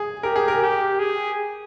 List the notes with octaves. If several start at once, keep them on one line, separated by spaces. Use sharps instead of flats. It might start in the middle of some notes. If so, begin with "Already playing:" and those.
Already playing: G#4
G4 A#4
G#4
A#4
G4
G#4